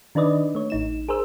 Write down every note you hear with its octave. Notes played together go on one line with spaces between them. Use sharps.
D#3 D4 D#4 B4 D5 D#5
A3 C#5
A1 D#4 E7
G#4 A#4 C5 E6